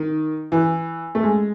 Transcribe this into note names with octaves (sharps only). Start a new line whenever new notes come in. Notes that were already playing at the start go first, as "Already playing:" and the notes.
Already playing: D#3
E3
A3
G#3